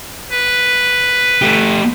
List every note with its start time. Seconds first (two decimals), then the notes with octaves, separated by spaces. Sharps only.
0.32 B4
1.42 A3 G4